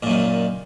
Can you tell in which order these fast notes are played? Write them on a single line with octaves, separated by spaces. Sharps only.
A#2 F#2 D#3